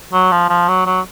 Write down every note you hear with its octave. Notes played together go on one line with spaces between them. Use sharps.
F#3
F3
F3
F#3
F#3